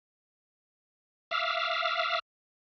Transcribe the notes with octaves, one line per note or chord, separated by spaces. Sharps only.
E5 F5 D6 E6 F6